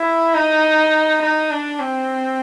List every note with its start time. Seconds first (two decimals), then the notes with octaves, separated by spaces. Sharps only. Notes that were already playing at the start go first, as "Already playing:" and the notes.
Already playing: E4
0.35 D#4
1.22 D#4
1.51 D4
1.79 C4